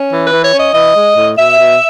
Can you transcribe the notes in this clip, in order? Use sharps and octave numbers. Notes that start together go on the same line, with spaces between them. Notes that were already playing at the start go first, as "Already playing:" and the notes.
Already playing: C#4
E3
B4
E3
C#5
C#4 D#5
E3 D#5
G#3
A2
B2 E5
B2